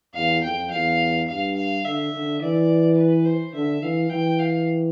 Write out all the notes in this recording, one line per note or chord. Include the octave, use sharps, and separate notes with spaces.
E2 F5
F2 G5
E2 F5
G2 F5
F5
D3 E5
D3
E3 D5
B4
C5
D3 E5
E3 F5
E3 G5
F5